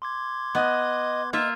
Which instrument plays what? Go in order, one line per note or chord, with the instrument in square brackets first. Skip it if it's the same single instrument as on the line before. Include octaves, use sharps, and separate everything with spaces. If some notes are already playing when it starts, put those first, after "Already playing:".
[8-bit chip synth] C6 D6 G#6
[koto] B3 [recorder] D#5
[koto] A#3 F4 E5 [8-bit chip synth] D#5